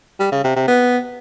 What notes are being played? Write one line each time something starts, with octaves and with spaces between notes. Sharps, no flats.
G3
C#3
C3
C3
B3